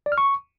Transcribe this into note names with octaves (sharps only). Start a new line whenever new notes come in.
D5
F6
C#6